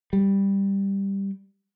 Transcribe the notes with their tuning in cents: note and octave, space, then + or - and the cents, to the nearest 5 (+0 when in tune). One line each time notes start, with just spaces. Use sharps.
G3 +5